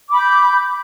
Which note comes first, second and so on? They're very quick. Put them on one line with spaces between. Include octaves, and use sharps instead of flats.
D6 B5 G6